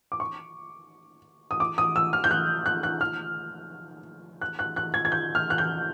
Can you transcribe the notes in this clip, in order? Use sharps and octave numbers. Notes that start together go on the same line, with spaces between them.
D6
C#6
D#6
D6
D#6
E6
F6
G6
F#6
F#6
F#6
F6
F#6
F#6
F#6
G#6
G#6
G6
F6
F#6
G6